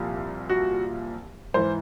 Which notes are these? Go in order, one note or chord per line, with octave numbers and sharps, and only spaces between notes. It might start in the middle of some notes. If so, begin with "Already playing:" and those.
Already playing: C2 A#2 F3
F#4
G#2 E3 C5